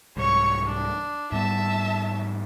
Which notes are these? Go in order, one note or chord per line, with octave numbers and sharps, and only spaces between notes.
C2 G#2 C#5 C#6
D4
G#2 G3 B3 E5 A5